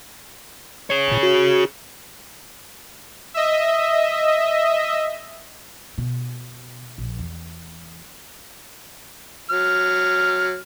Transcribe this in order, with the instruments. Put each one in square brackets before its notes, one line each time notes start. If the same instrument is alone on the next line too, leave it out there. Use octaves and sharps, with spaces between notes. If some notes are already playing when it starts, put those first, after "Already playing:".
[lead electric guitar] G#4 C#5
[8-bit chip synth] G#1 A#2
F#4
[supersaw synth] D#5 E5
[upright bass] B2
A#1
E2
[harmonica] F#3 F6